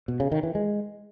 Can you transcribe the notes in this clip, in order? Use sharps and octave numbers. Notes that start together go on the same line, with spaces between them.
B2
C#3
D#3
E3
G#3